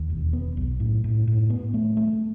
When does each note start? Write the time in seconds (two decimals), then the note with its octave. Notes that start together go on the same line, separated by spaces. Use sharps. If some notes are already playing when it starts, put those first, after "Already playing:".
Already playing: D#2
0.10 E1
0.33 B3
0.57 B1
0.80 A2
1.04 A2
1.28 A2
1.50 B3
1.74 A3
1.97 A3